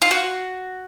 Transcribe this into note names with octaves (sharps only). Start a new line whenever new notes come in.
F4
F#4